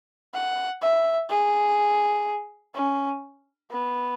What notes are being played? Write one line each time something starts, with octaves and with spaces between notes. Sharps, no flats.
F#5
E5
G#4
C#4
B3